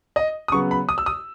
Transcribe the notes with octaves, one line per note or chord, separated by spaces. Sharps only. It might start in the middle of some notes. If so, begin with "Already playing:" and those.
D#5
D#6
C#3 F#3 B3 C#6
B5
D#6
E6
D#6